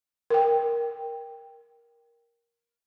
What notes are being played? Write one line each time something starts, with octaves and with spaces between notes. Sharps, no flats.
A#4 G5